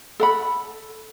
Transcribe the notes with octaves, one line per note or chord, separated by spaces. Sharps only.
A4 F#5 B5